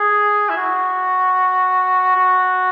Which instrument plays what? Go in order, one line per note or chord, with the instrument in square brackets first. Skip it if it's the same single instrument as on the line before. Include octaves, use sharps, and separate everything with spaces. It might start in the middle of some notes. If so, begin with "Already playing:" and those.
Already playing: [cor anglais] G#4
E4
F#4
F#4